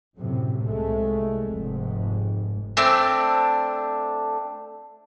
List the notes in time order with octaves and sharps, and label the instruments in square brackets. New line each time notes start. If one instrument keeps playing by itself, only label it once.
[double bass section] F#2 A2 C3
C2 G#3 A3
F1 G#2
[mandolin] A3 C4 D4